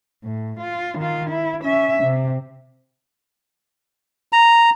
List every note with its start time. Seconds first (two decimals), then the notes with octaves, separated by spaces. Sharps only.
0.24 A2
0.59 F4
0.98 D#3 F4
1.30 E4
1.63 C#4 E5
2.03 C3
4.33 A#5